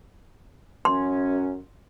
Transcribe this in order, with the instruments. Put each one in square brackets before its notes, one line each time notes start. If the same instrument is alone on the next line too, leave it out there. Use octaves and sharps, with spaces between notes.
[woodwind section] F#2 C#4 [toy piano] C6